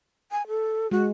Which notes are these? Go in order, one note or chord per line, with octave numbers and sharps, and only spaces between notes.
G#5
A4
G#3 F#4